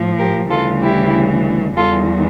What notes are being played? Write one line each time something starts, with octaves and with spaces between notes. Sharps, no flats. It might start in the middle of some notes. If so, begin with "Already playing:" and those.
Already playing: A2 F3
G4 A#4
D2 C#3 E3 G3 F4 A4
E4 G4
E2 E3 G3 F4 A4